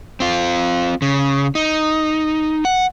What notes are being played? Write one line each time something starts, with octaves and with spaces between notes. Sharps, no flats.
C4 F4
C#3
D#4
F#5